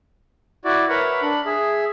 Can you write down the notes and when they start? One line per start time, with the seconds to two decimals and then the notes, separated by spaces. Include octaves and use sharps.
0.65 E4 F#4 D5
0.89 A#4 B4 C#5 E5 F#5
1.22 D4 B5
1.46 G#4 E5